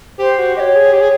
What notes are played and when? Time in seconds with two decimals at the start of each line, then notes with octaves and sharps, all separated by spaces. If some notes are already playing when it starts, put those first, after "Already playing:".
0.18 G4 C5
0.38 F#4
0.56 G4 D#5
0.60 C#5
0.76 G#4
0.93 G4 C#5
1.01 G#4